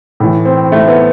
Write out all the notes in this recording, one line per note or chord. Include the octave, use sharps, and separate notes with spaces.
A2 E3
C4
A3
B3